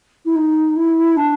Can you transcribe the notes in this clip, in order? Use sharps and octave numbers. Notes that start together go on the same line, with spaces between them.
E4
D#4
E4
D4